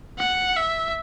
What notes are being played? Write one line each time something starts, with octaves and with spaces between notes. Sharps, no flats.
F#5
E5